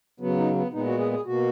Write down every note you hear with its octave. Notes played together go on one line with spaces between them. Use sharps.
C#3 F#3 B3
D#4
B3
A#2 G#3 B3 D#4
F#4
G#4
G#4
B2 A#3 F#4